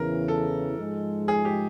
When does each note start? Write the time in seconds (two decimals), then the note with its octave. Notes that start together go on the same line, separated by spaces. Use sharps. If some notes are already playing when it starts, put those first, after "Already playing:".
Already playing: E2 C#3 E3 A#4
0.28 A4
0.78 G#2 F3 G#3
1.28 G#4
1.45 G4